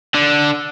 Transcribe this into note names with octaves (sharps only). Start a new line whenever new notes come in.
D3